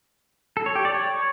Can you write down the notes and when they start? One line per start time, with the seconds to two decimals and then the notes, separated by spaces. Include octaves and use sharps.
0.57 A4
0.66 C#5
0.76 G4
0.85 D5
0.94 C#5